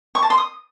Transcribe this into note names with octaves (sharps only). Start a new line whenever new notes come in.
C#6
A5
C6
D#6